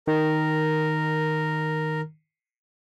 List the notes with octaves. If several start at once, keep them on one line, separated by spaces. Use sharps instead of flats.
D#3 A#4